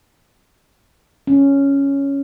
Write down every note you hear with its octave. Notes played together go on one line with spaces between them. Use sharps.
C#4